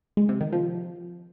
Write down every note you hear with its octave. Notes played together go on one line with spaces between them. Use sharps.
G#3
C3
D#3
F3